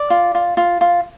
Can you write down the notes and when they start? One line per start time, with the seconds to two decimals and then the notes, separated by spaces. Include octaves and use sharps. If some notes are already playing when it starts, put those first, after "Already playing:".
Already playing: D5
0.10 F4
0.35 F4
0.57 F4
0.81 F4